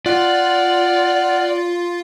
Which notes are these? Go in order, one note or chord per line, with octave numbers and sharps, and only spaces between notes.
F4 D5 F#5 F6 F#6